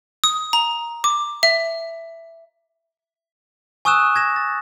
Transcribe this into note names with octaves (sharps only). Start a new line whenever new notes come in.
D#6
A#5
D6
E5
G#5 C#6 D#6 E6 F#6 E7
G#6 A#6 E7
A6